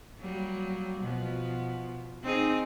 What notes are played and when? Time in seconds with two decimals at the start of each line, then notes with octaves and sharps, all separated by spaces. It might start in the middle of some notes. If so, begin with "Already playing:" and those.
0.19 F#3 G3 A#3
1.01 B2 F3 B3
2.22 C4 D#4 G#4